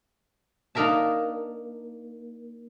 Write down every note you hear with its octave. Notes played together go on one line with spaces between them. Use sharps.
A#3 D4 D#4 A#4 E5 A5